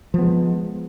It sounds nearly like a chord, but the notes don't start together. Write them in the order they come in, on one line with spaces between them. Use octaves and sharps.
F3 B3 G#3